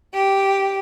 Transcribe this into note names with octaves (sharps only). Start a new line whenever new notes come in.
G4